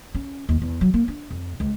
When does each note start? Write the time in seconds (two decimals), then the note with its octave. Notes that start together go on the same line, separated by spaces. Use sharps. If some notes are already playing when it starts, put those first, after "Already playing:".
0.15 C#4
0.49 D#2
0.62 E2
0.81 F#3
0.94 A#3
1.08 D4
1.30 F2
1.60 C#2